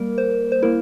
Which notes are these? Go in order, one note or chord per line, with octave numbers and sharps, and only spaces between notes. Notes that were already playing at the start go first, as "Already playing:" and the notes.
Already playing: G3 A#3 A#4
C5
C5
A#3 E4 A#4